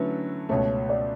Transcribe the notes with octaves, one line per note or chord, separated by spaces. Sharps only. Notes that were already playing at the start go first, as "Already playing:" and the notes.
Already playing: D3 F#3 A3 C#4 E4 B4
C#2 B2 A3 C#5
D5